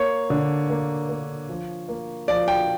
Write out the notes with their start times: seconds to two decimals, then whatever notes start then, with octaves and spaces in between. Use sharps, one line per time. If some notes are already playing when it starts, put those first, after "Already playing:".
Already playing: A#3 C#5
0.30 D3
0.70 A#3
1.09 A#3
1.49 F3
1.89 A#3
2.28 F3 D5
2.48 G5